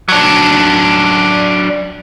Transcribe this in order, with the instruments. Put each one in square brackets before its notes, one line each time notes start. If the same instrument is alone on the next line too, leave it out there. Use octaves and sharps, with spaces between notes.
[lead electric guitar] F#3 D4